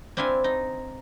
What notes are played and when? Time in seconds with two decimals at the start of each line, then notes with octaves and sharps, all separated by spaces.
0.17 C4 D4 E4 F5 G#5
0.44 D#4